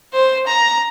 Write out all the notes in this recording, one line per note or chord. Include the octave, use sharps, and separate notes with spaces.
C5
A#5